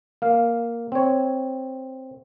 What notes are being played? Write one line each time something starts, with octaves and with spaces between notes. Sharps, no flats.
A#3 F5
C4 C#5